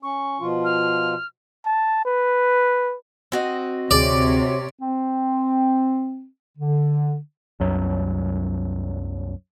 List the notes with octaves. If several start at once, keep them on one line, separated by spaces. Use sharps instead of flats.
C#4 C#6
B2 F3 F4
F6
A5
B4
C4 F#4 D#5
D2 C3 G#4 C#5 D5
C4
D3
C2 F#2 F#3